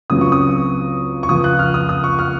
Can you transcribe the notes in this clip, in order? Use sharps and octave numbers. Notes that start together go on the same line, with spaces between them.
C#2 C#3 F#3 C4 D#6
C#6
D#6
C#6
C#2 C#3 F3 D#6
F#6
F6
D#6
D#6
C#6
F6